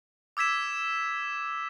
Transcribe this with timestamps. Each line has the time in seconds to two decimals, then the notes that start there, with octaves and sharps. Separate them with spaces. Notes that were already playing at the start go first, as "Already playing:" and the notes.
0.37 D6 E6 G#6 B6 E7